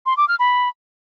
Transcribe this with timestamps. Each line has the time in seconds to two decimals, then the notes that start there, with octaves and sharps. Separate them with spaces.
0.06 C6
0.17 D6
0.28 F6
0.39 B5